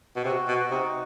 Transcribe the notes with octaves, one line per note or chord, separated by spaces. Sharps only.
B2
C3 F#4
B2
C3 D#4